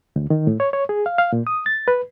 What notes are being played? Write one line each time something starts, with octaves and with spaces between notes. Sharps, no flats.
D2
D#3
A2
C#5
C#5
G#4
F5
F5
A#2
D#6
A6
B4